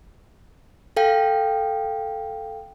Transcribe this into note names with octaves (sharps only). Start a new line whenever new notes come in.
A4 F5 G5